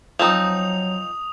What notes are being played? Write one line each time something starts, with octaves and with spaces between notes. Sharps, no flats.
F3 F#3 C4 D#4 D#6 F7